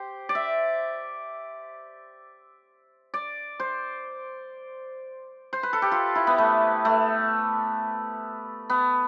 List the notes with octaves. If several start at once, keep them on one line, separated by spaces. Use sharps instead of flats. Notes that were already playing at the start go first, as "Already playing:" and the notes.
Already playing: G4 C5
D5
E5
D5
C5
C5
B4
A4
G4
F4
E4
B3
A3
A3
B3